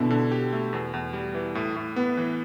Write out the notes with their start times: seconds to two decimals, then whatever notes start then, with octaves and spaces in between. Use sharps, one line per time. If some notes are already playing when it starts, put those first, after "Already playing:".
Already playing: B2 D3 E4
0.10 D3
0.32 G4
0.53 A3
0.73 E2
0.94 E2
1.13 G3
1.34 E3
1.55 A2
1.76 A2
1.96 B3
2.17 E3